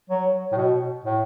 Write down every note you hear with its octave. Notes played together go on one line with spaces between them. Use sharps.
F#3
A2
B2
A2